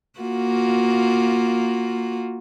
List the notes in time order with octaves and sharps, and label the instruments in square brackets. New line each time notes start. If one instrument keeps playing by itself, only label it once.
[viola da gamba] A#3 F4 F#4